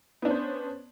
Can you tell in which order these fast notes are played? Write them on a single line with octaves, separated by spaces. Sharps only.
B3 D4 C#4 C5